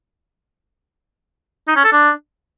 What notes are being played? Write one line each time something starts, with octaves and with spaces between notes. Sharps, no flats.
D#4
C#4
A4
D4